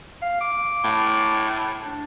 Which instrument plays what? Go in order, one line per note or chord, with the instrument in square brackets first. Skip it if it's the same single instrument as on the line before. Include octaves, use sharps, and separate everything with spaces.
[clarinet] F5
D6
[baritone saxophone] A2
[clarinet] D4